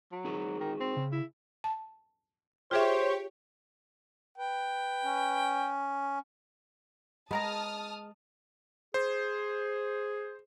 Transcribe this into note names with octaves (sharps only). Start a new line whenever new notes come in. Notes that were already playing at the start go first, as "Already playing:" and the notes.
F#3
D#4 F#4 G#4
D#3
C4
C#3
E4
A5
F4 G4 G#4 C5 C#5 E5
B4 G5
C#4
G#3 B3 A#4 A5 A#5 D#6 F6
G#4 C5